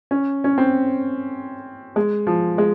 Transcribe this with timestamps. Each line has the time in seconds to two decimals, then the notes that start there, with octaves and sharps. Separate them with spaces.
0.11 C#4
0.44 C#4
0.58 C4
1.96 G#3
2.27 F3
2.58 G#3